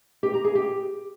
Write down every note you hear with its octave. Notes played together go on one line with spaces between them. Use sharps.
G4
A#5
G#4
G4